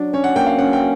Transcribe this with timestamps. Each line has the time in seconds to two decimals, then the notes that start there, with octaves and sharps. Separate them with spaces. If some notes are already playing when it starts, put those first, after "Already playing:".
Already playing: F#3 D4
0.13 C#4 C#5
0.24 F#5
0.36 A#3 G5
0.46 F5
0.58 C#4 F#5
0.73 G5